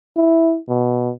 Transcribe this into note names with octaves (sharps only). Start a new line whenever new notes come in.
E4
B2